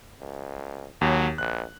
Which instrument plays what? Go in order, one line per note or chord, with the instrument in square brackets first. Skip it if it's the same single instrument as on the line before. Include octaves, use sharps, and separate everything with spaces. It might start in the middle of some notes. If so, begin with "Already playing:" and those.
[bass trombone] C#2
[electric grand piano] D#2 [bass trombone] F#3
[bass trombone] A#1 [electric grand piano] F#6